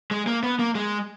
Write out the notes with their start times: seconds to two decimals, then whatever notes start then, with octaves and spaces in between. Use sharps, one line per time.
0.11 G#3
0.27 A#3
0.43 B3
0.59 A#3
0.75 G#3